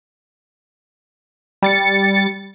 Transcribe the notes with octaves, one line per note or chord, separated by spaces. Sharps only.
G3 A6 C#7